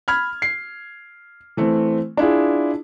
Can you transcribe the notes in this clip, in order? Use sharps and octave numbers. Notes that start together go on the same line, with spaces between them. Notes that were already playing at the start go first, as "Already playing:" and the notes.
B5 F6 G#6
C7
E3 A3 C4
D4 E4 F4 G#4